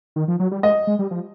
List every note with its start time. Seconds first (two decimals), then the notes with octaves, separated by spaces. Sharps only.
0.16 D#3
0.28 F3
0.40 F#3
0.51 G3
0.63 G#3 D#5
0.87 G#3
0.99 G3
1.11 F3